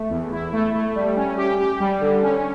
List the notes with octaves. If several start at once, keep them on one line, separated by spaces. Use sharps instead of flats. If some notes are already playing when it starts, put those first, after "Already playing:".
Already playing: A3
E2
E4
A3
A3
G3
C#4
G4
G4
G3
D3
C#4